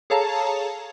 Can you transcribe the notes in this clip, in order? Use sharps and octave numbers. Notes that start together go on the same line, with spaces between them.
G#4 A4 C#5 F5 A5 A#5